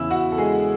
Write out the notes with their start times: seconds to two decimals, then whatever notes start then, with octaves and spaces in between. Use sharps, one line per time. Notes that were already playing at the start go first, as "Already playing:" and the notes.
Already playing: E2 C#3 E3 E4 E5
0.11 F#4 F#5
0.32 A4
0.38 G#3 G#4